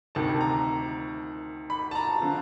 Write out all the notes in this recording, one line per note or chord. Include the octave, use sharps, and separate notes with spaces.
D2 C3 D#3 A5
A#5
B5
A5
A#5
D3 F3